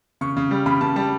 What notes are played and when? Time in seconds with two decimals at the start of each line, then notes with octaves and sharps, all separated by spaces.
0.21 C#3 C#6
0.37 C#3
0.51 G3
0.66 C#3 B5
0.81 C#3 A5
0.96 G3 A5